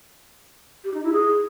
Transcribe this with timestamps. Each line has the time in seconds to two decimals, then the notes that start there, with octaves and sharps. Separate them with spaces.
0.84 G4
0.94 D#4
1.03 E4
1.13 G#4